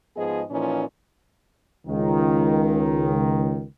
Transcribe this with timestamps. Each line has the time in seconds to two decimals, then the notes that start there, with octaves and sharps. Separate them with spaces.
0.17 G#2 F3 B3 G#4 D#5
0.50 A#2 E3 F3 C#4 D#4
1.87 C#2 D#3